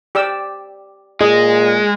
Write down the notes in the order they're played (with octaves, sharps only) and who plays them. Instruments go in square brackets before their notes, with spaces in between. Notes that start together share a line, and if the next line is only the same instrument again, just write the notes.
[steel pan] G4 D5 E6
[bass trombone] A#2 [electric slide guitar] G#3 [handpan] G#4 [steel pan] D#5